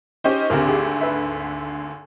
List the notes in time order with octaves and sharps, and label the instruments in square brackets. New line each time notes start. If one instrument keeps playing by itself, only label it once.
[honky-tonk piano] C#4 D#4 C5 [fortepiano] G4
[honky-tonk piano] G#1 D2 D3 [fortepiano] C4 G4 A#4
[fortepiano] G4 G#4
B4 E5